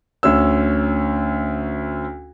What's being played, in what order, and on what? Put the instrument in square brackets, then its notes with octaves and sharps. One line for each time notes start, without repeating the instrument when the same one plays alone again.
[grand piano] D2 C#4 E6